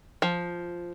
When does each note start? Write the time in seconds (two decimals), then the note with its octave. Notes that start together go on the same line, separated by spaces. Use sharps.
0.22 F3